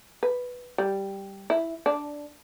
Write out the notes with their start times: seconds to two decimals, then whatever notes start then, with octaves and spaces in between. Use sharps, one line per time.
0.23 B4
0.78 G3
1.50 E4
1.86 D4